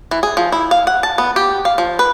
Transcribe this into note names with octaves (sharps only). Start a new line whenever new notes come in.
E3
G#4
F3
E4
F5
F#5
A5
B3
G4
F5
F3
B4